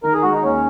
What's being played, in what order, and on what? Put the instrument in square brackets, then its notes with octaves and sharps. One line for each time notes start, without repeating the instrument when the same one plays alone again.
[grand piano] D#3 [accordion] A#4
[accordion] G#4
[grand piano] G#3 [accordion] F#4
[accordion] D#4
[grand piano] D#2 [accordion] C#4